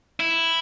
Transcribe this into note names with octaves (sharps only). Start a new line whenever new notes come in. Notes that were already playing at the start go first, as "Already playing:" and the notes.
E4